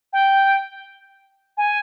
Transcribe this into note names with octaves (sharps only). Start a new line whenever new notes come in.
G5
G#5